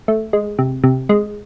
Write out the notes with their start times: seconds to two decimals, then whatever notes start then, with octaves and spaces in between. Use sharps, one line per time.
0.08 A3
0.33 G#3
0.59 C3
0.84 C3
1.09 G#3